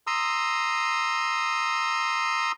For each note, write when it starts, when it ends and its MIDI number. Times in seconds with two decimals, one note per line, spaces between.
0.07 2.52 82
0.07 2.52 84
0.07 2.52 87
0.07 2.52 88